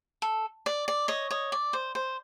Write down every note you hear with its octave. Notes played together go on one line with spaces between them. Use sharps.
A4
D5
D5
C#5 D#5
C#5 D#5
D5
C5
C5